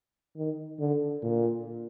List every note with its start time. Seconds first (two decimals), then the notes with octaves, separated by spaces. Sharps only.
0.37 D#3
0.80 D3
1.23 A#2